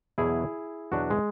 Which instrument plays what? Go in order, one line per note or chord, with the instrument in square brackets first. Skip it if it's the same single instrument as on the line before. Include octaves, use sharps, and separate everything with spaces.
[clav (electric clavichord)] E2 B2 F#3 E4 G#4
E2 B2 F#3 D4 F#4
G#3